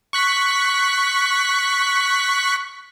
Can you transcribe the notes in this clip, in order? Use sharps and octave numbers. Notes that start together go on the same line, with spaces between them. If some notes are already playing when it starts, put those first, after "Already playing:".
C#6 F#6 B6